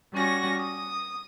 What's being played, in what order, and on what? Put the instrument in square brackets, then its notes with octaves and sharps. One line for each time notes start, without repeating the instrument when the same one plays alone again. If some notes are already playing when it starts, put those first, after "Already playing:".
[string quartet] G3 C#4 F#4 A#6
D#6